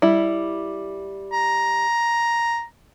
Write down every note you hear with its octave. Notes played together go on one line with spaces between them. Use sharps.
G3 E4
A#5